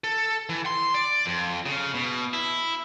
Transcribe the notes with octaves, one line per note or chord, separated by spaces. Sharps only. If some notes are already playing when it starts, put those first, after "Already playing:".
A4
E3
C6
D5
F2
C#3
B2
E4